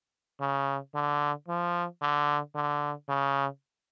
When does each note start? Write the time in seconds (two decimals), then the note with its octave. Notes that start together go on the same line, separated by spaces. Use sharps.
0.40 C#3
0.94 D3
1.48 F3
2.02 D3
2.55 D3
3.09 C#3